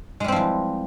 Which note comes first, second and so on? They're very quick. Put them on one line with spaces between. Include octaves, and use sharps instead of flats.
G#3 G3 C4 F3 E3